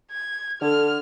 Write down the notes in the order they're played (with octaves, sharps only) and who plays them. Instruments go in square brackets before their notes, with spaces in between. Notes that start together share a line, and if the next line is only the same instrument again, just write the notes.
[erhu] G#6
[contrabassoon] D3 [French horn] A4 [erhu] F6